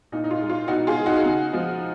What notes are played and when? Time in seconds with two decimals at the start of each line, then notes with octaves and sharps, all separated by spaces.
0.12 A#2 D#4
0.24 D#4
0.31 F4
0.40 G#3
0.49 F4
0.68 B2 D#4 F#4
0.87 F4 G#4
0.97 G#3
1.06 D#4 F#4
1.25 C#3
1.53 F3 G#3